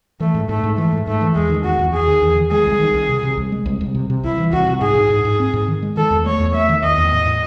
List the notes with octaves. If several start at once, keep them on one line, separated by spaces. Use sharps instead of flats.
E3 A3
G#2
G#2 A3
G#2
E3 A3
G#2
G#2 A3
E3
E2 G#3
D#3
E2 F#4
E2
E2 G#4
D#3
E2
D#3
G#3 G#4
C2
D#3
C2
C3
C3
C2
G#3
C2
C2
C3
C3
C2 E4
E3
C2 F#4
C3
G#2 G#4
G#2
G#2
G#2
C4
G#2
D#3
G#3
D#3 A4
E2
A3 C#5
E2
A3 E5
D#3
E2 D#5
E2
A2
A2